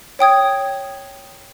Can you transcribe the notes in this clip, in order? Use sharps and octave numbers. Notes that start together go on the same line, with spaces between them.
C#5 G5 D#6 G#6